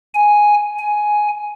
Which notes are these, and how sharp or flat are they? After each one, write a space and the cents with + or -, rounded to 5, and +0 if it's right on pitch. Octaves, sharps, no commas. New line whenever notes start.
G#5 +0
G#5 +10